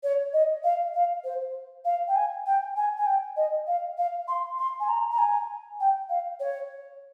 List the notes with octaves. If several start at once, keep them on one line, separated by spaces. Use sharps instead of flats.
C#5
D#5
F5
F5
C5
F5
G5
G#5
G5
G#5
G#5
G5
D#5
F5
F5
C6
C6
G#5
A#5
A#5
G#5
G5
F5
C#5